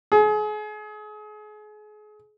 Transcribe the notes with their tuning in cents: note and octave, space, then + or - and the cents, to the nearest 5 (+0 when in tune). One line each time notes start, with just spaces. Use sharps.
G#4 +35